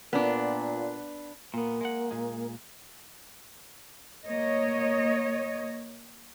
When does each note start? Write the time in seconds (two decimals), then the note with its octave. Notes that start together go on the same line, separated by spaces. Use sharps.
0.13 A#2 B3 D4
1.54 A#2 A#3 B3
1.81 G#3 F#5
2.11 A#2 G#3
4.28 A#3 C#5 D#5